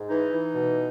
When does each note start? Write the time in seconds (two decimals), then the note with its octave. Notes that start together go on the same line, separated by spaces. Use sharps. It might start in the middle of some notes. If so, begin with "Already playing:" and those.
Already playing: G#2
0.08 E3 D#4
0.31 E3
0.54 B2